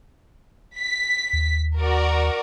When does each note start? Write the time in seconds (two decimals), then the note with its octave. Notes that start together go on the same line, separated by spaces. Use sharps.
0.77 B6
1.33 D#2
1.79 F#4 A#4 D5